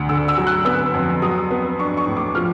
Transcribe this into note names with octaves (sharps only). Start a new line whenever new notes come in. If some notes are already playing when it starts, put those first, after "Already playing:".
Already playing: D2
D3 E6
E6
F#3
F#6
B3 E6
F2
F#3 D#6
B3
D4 C#6
C#6
A2
D6
F3 F6